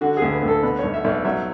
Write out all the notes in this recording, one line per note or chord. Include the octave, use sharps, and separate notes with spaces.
D3 F#4
D2 G#4
B4
D2
A4
B2 B4
B1 C#5
E5
B1 D5 E5
F#3 E5